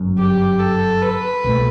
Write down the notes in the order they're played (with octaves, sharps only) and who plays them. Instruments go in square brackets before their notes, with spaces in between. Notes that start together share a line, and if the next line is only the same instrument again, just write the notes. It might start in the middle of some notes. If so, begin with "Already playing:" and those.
Already playing: [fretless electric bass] G1 F#2 F#3
[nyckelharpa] G4
A4
B4
[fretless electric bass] C2 B2 A3